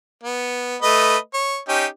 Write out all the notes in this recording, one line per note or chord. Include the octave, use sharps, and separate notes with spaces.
B3
A3 B4 D#5
C#5
C#4 D#4 G4